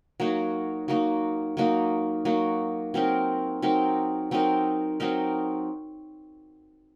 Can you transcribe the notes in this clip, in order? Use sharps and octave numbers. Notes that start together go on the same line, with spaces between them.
F#3 A#3 D#4 F#4
F#3 A#3 D#4 F#4
F#3 A#3 D#4 F#4
F#3 A#3 D#4 F#4
F#3 C4 D#4 A#4
F#3 C4 D#4 A#4
F#3 C4 D#4 A#4
F#3 C4 D#4 A#4